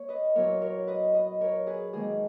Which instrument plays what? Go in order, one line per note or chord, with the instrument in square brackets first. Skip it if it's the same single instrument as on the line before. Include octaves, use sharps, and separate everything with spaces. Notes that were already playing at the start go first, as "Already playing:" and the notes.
Already playing: [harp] A#3 C#5
B4 D#5
A#2 F#3 B3 E4 A#4 C#5
A#4 C#5
B4 D#5
B4 D#5
A#4 C#5
G#4 B4
G#2 D#3 A#3 D#4 G#4